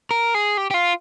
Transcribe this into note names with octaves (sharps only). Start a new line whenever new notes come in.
A#4
G#4
G4
G4
F4